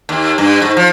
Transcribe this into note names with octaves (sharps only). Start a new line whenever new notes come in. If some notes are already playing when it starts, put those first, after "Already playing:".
D#2
G2
G#2
F3